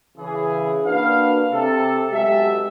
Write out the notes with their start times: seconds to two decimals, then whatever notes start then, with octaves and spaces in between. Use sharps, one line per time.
0.18 C#3 E3 G#4
0.85 A#3 D4 F#4 B4 F5
1.52 C3 A4
2.11 B1 G#3 F#4 G4 A4 E5